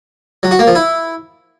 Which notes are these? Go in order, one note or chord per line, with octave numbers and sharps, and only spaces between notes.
F#3
F#4
A#3
F3
E4